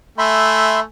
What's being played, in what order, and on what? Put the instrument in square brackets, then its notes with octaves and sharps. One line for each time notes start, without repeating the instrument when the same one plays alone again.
[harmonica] A3 G#5 [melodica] E5 B5 C6